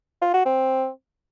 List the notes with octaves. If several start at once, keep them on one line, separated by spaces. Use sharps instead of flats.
F4
F#4
C4